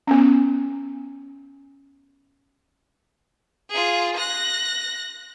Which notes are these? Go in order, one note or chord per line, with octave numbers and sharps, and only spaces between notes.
B3 C#4
F4 G#4
F#6 A#6